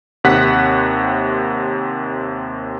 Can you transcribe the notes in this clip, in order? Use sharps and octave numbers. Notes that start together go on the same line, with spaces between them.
D#2 C3 F#5 F#6 B6